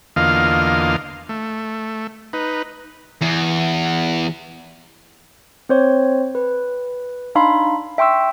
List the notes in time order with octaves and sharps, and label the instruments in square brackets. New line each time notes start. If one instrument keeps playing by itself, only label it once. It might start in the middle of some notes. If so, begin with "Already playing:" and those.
[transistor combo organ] E2 D3 A#3 F4 D#5 F5
A3
D#4 B4
[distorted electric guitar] E2
[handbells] C4 C5 C#5
B4
D4 D#4 F5 B5 C6
E5 G5 C6 C#6 E6